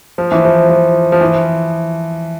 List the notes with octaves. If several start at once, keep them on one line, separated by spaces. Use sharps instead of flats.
F3
E3
F3
F3
F3
E3